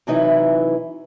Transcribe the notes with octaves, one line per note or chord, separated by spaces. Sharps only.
C3 E3 F#3 D#4 E4 B4